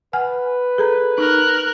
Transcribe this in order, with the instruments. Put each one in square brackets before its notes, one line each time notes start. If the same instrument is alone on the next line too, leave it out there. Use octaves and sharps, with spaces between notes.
[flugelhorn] B4 [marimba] F#5 G#5 F6
[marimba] G#4 A4 A#5
[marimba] D#4 [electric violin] A#4 F#6